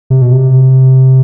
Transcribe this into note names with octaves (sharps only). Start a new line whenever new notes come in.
C3
B2
C3